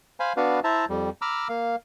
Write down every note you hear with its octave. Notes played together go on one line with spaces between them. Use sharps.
C5 F5 G#5 B5
B3 D4 F#4 B4 F5
E4 C5 E5 A5 A#5
F2 G3
A#5 B5 D6 E6 F6
A#3 F5